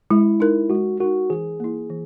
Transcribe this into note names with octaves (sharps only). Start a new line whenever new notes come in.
G#3 E4
D#4 A#4
G#3 F#4
D#4 F#4 A#4
E3 G#4
A#3 E4
E3